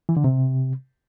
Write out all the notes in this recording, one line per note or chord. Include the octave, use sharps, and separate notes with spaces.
E3
D3
C3